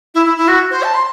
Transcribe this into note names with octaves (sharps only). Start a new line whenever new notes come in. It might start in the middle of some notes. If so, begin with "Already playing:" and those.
E4
E4
E4
F#4
C5
A5
C6